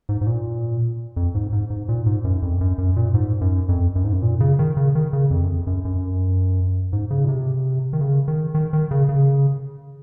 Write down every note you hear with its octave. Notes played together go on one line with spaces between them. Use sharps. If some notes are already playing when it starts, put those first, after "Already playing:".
G#2
G#2
A#2
F2
G#2
G#2
G#2
A#2
G#2
F#2
F2
F#2
F#2
A#2
G#2
F#2
F2
F#2
G#2
F#2
A#2
C#3
D#3
C#3
D#3
C#3
F2
F#2
F2
F#2
F#2
G#2
C#3
A#2
C3
D#3
C#3
D#3
D#3
D#3
C#3
C#3